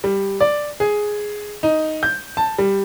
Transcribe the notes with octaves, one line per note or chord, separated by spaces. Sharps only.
G3
D5
G#4
D#4
G6
A5
G3